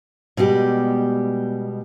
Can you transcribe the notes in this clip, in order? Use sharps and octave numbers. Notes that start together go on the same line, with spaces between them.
B2 G3 G#3 G4